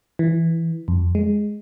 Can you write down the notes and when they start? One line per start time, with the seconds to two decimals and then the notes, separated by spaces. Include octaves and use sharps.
0.19 E3
0.88 F2
1.15 G#3